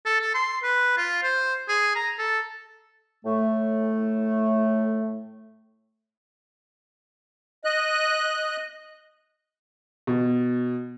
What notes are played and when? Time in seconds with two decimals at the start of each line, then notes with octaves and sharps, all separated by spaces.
0.05 A4
0.21 A4
0.34 C6
0.63 B4
0.97 F4
1.23 C5
1.68 G#4
1.95 A#5
2.18 A4
3.25 A2 A3
7.65 D#5 F#6
10.07 B2